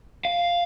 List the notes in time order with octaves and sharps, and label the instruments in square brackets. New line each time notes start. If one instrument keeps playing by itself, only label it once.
[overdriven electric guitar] F5